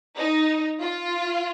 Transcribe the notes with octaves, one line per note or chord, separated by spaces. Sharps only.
D#4
F4